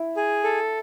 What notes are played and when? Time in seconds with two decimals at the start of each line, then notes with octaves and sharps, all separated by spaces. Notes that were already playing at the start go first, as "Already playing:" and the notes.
Already playing: E4
0.17 G#4
0.44 A4